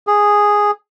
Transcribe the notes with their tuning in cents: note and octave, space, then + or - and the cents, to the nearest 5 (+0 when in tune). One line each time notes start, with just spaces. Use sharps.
G#4 -5